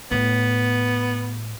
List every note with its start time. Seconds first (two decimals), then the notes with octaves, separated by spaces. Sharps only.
0.11 A2 B3